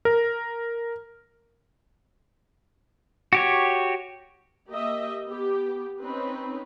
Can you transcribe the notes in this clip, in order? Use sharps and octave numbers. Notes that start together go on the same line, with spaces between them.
A#4
F#4 G4 C#5
A#3 G4 D#5 E5
B3 G4
C4 C#4 D#4 B4